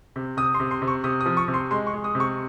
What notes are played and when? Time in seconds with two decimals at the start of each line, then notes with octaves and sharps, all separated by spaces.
0.16 C3
0.37 C3 D#6
0.54 C6
0.60 C3
0.71 C6
0.82 C3
0.87 C#6
1.04 C3 D#6
1.21 D#6
1.26 F3
1.37 C#6
1.48 C3
1.54 C6
1.71 G#3 C6
1.87 C#6
1.93 G#3
2.04 D#6
2.15 C3
2.20 C#6